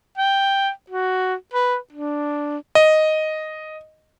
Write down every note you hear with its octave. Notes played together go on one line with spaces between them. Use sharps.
G5
F#4
B4
D4
D#5